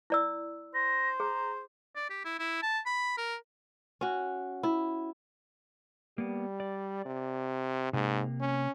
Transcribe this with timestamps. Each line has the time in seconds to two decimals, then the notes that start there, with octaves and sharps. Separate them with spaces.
0.10 E4 D5 E6
0.74 C5 A#6
1.20 G#4 A#5
1.96 D5
2.10 G4
2.25 E4
2.39 E4
2.62 A5
2.86 B5
3.17 A#4
4.01 C#4 F#4
4.63 E4
6.18 G3 A#3 B3
6.60 D5
7.06 C3
7.93 G#2 C3 A#3
8.41 C#4